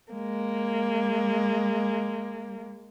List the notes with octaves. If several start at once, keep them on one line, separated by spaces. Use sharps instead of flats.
G#3 A#3